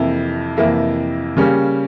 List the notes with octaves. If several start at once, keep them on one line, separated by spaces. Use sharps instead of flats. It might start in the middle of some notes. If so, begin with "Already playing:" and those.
Already playing: F2 C3 E3 A#3 E4
F2 C3 E3 A#3 E4
C#3 G3 A#3 C#4 G4